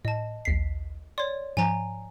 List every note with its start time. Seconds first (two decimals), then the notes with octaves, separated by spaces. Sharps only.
0.05 A2 D#5 A5
0.45 A#1 D#2 B6 C7
1.18 C#5 D5 C6
1.57 G#2 F3 G#5 A#5